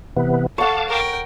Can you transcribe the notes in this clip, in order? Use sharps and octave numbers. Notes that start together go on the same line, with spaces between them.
C3 E3 B3
A4 C#5 F5 F#5 A5 D6
A#4 G5